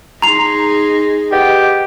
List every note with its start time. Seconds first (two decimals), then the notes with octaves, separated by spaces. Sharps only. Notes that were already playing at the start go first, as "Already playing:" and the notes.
0.22 D#4 G#4 A#5 C6 C7 F7
1.32 G4 B4 D#5 F#5